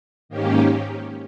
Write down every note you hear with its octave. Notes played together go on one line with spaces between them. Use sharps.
G#2 D#3 A#3 C#4 G4